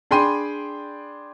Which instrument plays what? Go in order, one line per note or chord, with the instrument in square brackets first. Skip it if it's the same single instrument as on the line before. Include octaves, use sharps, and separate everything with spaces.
[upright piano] D4 G#4 G5 B5 C6 D#7